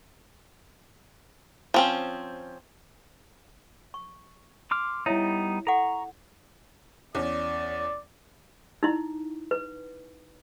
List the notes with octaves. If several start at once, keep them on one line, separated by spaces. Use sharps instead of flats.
F3 C4 C#4
C#6
C6 D6 F6
G3 B3 D#4 E4 C#5 E5
A4 F#5 A#5 C#6
E2 C#4 D5
D#4 E4
B4